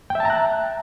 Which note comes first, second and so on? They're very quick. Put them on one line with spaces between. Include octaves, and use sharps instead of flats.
G5 E5 A5 A#5 F#6